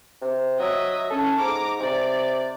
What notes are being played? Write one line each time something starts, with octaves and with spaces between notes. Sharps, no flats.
C3
F#3 D#5 E5
C#4 A4
G#2 A#5 D6
C3 D5